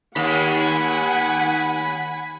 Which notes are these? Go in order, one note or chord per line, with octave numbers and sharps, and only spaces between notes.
D#2 F#5 G#5 B5